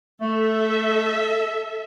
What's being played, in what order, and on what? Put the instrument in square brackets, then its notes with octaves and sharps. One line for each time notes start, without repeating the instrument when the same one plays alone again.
[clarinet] A3 [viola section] A4 E5